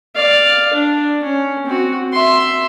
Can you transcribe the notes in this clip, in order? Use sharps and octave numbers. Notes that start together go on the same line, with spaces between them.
D5 F5
D4
C#4
C4 F#4
E5 C6